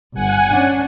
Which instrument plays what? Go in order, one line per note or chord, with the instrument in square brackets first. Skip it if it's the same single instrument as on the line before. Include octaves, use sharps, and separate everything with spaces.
[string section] G1 [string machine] F#5 G#5
[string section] C#4 D4